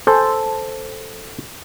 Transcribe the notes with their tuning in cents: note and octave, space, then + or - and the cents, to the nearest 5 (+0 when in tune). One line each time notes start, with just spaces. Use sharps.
A4 +0 C5 +0 G#5 +0